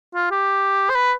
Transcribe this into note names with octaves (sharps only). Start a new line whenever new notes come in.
F4
G4
C5
B4